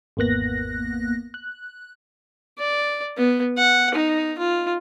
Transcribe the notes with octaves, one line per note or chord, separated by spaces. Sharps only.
G#1 E2 A#3 B3 F#6 A#6
F#6
D5
B3
F#5
D#4
F4